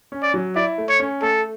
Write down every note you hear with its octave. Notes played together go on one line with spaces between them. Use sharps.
C#4
D5
F#3
E4 D5
A3
C#5
C#4
A3 A4